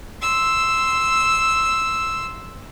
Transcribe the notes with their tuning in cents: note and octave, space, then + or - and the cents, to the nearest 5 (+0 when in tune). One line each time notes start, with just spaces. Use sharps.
C6 +0 E6 +0